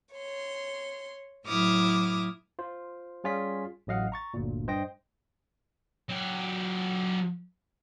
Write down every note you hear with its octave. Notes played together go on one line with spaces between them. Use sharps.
C#5 C6
A2 F#3 E4 D6 D#6 F6
F4 C5
G3 C#4 F4 G#4 B6
A1 F#3 D#5 F5 F#5
A#5 C#6 A6
G1 D2 A#2
G2 C5 D#5 G5 A#6
F#3 G4